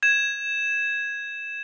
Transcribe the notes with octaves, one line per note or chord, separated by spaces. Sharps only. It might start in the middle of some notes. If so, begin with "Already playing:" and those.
G#6 E7